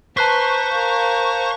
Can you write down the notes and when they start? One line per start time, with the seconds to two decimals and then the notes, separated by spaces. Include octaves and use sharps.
0.17 B4 C5 A5 A#5 C#6 F#6 B6
0.71 A#4 F5